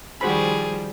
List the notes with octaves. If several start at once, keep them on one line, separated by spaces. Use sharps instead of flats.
D#3 F3 G3 F#4 G#4 C5 B5